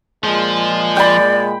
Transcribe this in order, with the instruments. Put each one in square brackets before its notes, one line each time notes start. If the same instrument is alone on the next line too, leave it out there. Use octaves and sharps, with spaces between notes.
[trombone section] A#2 G#3 [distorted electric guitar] F3
[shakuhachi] D5 [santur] G5 B5